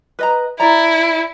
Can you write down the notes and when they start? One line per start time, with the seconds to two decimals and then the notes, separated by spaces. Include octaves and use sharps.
0.19 B4 D#5 A#5
0.60 E4 D5 A#5